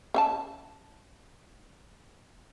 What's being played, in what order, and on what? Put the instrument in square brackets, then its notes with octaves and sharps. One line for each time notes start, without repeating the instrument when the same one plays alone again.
[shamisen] C#4 E5 A5